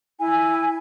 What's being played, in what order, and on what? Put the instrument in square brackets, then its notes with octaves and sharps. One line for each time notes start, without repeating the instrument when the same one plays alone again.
[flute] E4 [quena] G#5